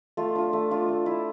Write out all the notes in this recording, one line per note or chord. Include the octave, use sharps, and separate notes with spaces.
A3 F4
D4 F4
A3
D4 F4
A3
E4